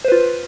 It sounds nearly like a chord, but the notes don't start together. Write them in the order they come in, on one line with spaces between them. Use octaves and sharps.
C5 B4 F4